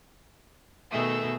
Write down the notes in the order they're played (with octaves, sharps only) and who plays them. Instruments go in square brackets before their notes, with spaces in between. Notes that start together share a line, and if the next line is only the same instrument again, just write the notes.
[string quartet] B2 G#4 E6 [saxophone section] D#3 A3